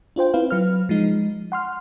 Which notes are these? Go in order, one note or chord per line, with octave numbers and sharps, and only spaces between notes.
D4 F4 C5 G5
C4 E4 B4 F5
F#3 B4 F6
F3 G#3 D#4
F#5 C6 F6